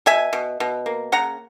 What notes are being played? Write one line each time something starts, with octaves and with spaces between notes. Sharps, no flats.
B2 E5 G#5
B2
B2
A#3
C#3 F#5 A#5